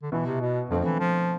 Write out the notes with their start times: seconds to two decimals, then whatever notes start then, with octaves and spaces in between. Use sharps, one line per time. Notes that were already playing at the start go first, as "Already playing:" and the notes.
0.03 D3
0.12 B2 E3 B3 E4
0.26 C3
0.41 B2
0.70 F2 D3 F3 A3 C4
0.85 E3
0.99 F3